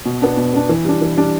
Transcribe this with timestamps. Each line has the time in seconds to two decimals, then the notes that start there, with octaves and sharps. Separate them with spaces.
0.06 B2
0.22 B3 D4
0.37 B2
0.54 B3 D4
0.69 E3
0.85 G3 D4
1.01 E3
1.17 G3 D4